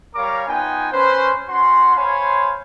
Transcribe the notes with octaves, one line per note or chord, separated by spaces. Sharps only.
G3 A#4 C#5 F5 A#5 D6
B3 D#4 F4 G5 G#5
C#4 B4 C5
C#4 F#4 F#5 C6
C5 C#5 F5 G#5 B5 C6